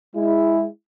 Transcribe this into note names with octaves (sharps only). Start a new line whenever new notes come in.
G#3 E4